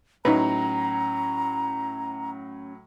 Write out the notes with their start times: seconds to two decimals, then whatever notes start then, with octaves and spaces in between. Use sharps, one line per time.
0.25 A2 F#3 C#4 D#4 B4 A#5